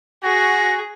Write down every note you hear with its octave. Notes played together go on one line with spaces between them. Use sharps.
F#4 G#4 A#6